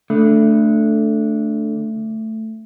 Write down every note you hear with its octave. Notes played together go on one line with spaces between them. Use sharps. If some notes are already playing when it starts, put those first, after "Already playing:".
D3 A3